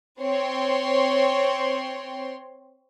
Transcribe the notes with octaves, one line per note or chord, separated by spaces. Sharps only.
C4 C#5 C6